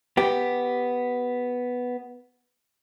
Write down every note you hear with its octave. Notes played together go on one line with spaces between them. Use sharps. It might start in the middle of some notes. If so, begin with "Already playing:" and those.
B3 G4